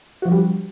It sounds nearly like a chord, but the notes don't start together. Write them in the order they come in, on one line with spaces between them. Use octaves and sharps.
F#4 F3 D4 G3